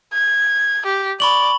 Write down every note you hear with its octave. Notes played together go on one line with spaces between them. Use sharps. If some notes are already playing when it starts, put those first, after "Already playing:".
G#6
G4
D5 B5 C#6 F#7